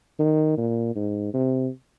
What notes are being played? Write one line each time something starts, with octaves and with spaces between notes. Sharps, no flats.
D#3
A#2
G#2
C3